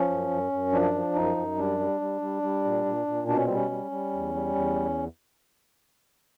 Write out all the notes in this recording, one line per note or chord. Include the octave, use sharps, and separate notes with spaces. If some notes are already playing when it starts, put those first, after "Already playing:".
Already playing: F3 C#4
F#2
F#2
F#2
F3 D4
F3
F#2 D#4
F#2
G3 D4
G3
G3
G3
G3
A#2
A#2
A#2
B2 D4
C#4
G3 C4
C#4
G3
G3
E2
G3
E2